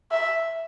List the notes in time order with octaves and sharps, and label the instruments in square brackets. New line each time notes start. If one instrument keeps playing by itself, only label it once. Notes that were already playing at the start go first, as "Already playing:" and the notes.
[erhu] E5